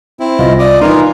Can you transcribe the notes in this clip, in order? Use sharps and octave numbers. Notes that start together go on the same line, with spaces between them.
C4 E4
C2 F4 D#5
D5 D#5 D6
E3 D#4 F4 A#4 A#5 C6